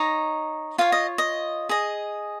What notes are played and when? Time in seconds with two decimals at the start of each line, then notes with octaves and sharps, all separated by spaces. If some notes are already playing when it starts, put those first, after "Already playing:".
Already playing: D#4 C#5 A#5
0.78 F4 C#5 F5
0.92 D#5
1.18 D#5
1.69 G#4 D#5